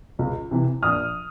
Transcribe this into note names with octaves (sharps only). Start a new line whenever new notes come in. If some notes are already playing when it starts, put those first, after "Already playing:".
C#2
C3 E3
A#1 D#6 F6